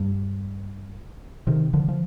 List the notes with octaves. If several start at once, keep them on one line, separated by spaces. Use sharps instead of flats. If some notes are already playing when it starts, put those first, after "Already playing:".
Already playing: G2
C3 D#3
D3 F3
F3